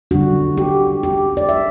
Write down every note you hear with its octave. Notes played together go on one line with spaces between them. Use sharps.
D3 G3 D4 F#4
G4
G4
D5
E5